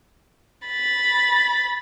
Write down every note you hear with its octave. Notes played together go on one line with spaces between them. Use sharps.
B5 A6